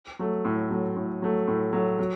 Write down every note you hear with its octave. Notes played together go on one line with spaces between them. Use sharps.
F#3 A3
A2
F#3 A3
A2
F#3 A3
A2
F#3 A3
F#3